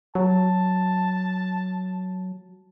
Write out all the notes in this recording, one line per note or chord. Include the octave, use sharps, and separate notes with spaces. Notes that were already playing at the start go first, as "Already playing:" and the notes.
F#3 A5